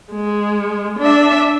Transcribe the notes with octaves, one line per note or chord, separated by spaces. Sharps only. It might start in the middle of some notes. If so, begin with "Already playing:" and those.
G#3
D4 E5